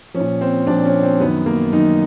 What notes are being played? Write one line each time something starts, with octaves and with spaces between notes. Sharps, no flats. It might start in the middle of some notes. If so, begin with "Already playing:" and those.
F3 C#4
A#2
C4
A#2 F3 D4
C#4
C4
F#2 D#3 B3
A#3
F#2 D#3 D#4